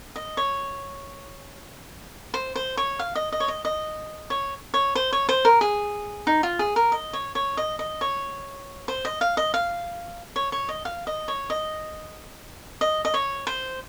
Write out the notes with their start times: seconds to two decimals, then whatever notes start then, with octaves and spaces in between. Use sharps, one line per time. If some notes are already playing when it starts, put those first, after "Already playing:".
0.16 D#5
0.37 C#5
2.34 C5
2.56 C5
2.77 C#5
2.99 F5
3.15 D#5
3.32 D#5
3.40 C#5
3.48 D#5
3.65 D#5
4.30 C#5
4.74 C#5
4.95 C5
5.13 C#5
5.29 C5
5.45 A#4
5.61 G#4
6.27 D#4
6.43 F4
6.59 G#4
6.76 A#4
6.92 D#5
7.13 C#5
7.35 C#5
7.57 D#5
7.79 D#5
8.01 C#5
8.88 C5
9.05 D#5
9.21 F5
9.37 D#5
9.54 F5
10.36 C#5
10.52 C#5
10.69 D#5
10.85 F5
11.07 D#5
11.28 C#5
11.50 D#5
12.81 D#5
13.05 D#5
13.14 C#5
13.47 C5